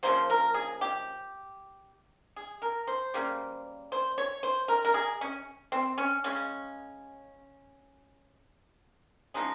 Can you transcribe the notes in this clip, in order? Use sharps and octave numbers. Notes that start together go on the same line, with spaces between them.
C#3 F3 A#3 C5
A#4
G#4
G4
G#4
A#4
C5
C#3 G3 A#3
C5
C#5
C5
A#4
A#4
G#4
C#4
C4
C#4
C#3 G#3 C#4
C#3 F3 G#3 D#4